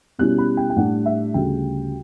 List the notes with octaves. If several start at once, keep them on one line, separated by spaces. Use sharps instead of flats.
B2 G3 C#4 E4 F#6
B5
G5
G5
A2 G3 D4 F#5
E5
D2 C#3 G3 G5